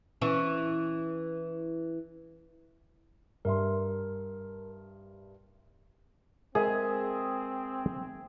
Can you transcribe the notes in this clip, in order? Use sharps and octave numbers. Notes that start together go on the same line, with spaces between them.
E3 C#4
G2 A#4 E5 C6
G#3 C4 G#4 A#4 E5